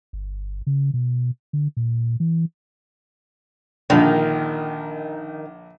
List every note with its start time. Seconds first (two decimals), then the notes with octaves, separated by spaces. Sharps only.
0.13 G1
0.67 C#3
0.94 B2
1.53 D3
1.77 A#2
2.20 E3
3.90 A#1 D3 D#3